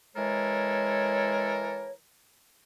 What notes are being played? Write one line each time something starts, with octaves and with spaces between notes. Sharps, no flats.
E3 G#3 A4 A#4 C#5